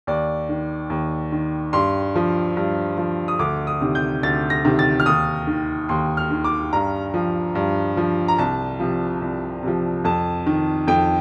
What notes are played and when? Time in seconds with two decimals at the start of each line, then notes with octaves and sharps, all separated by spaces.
0.07 D#2 D5
0.49 D#3
0.90 D#2
1.32 D#3
1.73 G2 C6
2.16 F3
2.57 G2
2.98 F3
3.28 D#6
3.39 D2 D6
3.67 D#6
3.81 C3 D#3
3.95 G6
4.23 D2 A6
4.50 A#6
4.65 C3 D#3
4.79 A6
5.00 F6
5.06 D#2 D#6
5.47 D#3
5.89 D#2 C6
6.17 F6
6.31 D#3
6.44 D6
6.73 G2 A#5
7.14 F3
7.55 G2
7.97 F3
8.28 A#5
8.38 C2 A5
8.80 C3 F3
9.22 C2
9.63 C3 F3
10.04 F2 A5
10.46 D#3
10.87 F2 G5